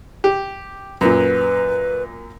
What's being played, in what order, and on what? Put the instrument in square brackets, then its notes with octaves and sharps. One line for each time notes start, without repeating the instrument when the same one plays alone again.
[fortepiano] G4
[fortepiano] F#2 A#2 [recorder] B4